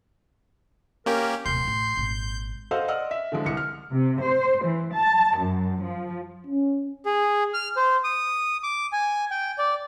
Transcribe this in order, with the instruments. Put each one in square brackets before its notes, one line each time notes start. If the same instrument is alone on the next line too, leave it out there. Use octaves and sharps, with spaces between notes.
[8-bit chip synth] A#3 C#4 G4 [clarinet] A#4
[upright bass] D1 B2 [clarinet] C6 [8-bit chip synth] G6
[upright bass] A1 A2
G#1 A#2
[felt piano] A4 C5 D#5 F5 F#5
D5 D#5 F#5 E6 F6
E5
D3 E3 F3 G#3
C2 C#7
F6
[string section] C3
C5
E3
A5
F#2
F3
[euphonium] C#4
[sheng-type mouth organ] G#4
F6
C5
D#6
D6
G#5
G5
D5